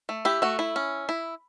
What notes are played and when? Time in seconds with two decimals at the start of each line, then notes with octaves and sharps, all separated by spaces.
0.09 A3
0.25 E4 G4
0.42 A3 F#4
0.59 E4
0.76 C#4
1.09 E4